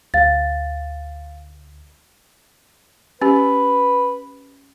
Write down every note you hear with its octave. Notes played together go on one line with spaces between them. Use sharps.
D2 F5 A6
C#4 G4 B4